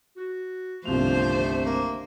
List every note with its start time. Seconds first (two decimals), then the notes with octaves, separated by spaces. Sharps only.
0.17 F#4
0.85 G1 C2 D#3 F3 A3 D4 C5 F7
1.66 A#3